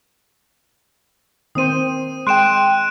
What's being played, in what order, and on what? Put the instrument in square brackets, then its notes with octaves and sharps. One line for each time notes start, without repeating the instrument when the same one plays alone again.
[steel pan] D#3 C4 C5 [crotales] D#6 D#7
[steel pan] G#3 [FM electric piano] G5 C6 [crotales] F#6 D7 E7